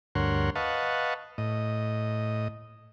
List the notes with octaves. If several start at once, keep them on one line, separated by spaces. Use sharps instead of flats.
D2 G2 A#4 C#5 F#5 C6
B4 D#5 F5 F#5 A5 C#6
A2 D#5